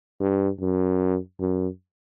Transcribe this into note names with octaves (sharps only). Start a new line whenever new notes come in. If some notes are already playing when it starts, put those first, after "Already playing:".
G2
F#2
F#2